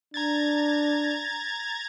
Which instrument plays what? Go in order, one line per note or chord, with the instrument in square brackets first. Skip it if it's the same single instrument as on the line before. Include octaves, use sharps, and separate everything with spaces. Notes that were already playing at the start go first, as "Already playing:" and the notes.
[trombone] D4 [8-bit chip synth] A#5 G#6 A6